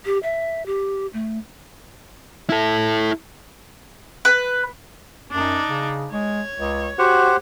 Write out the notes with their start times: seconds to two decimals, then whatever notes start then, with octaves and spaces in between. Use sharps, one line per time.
0.05 G4
0.23 E5
0.66 G4
1.13 A3
2.50 E4 A4
4.25 B4
5.32 F#2 D4 D#4
5.68 C#3
6.13 G#3 C#5
6.58 C#2
6.99 F#4 G4 C5 F#5